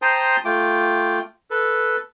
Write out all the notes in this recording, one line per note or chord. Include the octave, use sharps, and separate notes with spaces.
C5 G5 A5 A#5 C6 D#6
A3 F4 G5 D6
A4 B4